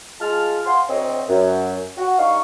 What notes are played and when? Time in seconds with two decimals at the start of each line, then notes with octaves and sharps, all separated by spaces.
0.21 G#3 F4 A5 F6
0.65 C5 F5 F#5 G#5 C6
0.89 D2 C4 C#5 D#5
1.29 F#2
1.98 F#4
2.17 G2 D#4 F5 C#6